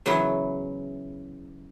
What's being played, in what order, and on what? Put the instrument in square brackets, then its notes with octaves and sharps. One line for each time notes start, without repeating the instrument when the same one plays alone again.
[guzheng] E2 C#3 F#3 B3 E4